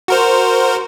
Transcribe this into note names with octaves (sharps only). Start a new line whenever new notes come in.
F#4 A#4 C5